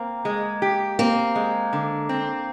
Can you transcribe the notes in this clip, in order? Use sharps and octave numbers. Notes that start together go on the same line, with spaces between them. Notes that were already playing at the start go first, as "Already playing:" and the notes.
Already playing: A#3 C4
G#3
G4
A#3 C4
G#3
D3
C4